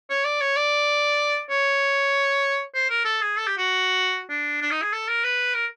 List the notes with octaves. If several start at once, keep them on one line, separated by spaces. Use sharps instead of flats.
C#5
D5
C#5
D5
C#5
C5
A#4
A4
G#4
A4
G4
F#4
D4
D4
D#4
G#4
A4
A#4
B4
A#4